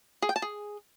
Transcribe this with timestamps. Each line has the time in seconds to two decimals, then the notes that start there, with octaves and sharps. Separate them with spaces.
0.22 G#4
0.29 G5
0.36 A5
0.42 G#4